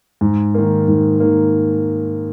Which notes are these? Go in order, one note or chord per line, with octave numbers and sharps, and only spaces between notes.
G#2
D#3 A#3
G#2
D#3 A#3